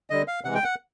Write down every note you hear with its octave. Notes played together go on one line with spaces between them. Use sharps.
D3 G3 D#5
F5
C3 E3 G#3 F#5
G5
F#5